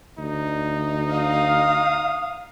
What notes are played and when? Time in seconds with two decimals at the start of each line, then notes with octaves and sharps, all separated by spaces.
0.18 D2 D#4
1.14 F5 D#6